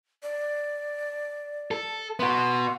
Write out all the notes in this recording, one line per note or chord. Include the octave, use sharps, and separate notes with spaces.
D5
A4
B3 F#4 C6